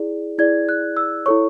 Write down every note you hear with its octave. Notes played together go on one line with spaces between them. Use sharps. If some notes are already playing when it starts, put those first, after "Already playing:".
Already playing: E4 G#4 D5
E4 G#4 D5 G#6
F#6
E6
E4 A4 C#5 C#6